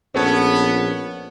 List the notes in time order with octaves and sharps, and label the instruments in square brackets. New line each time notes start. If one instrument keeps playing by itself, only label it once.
[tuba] A#1 [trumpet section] B3 [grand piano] C#4 A4 C#5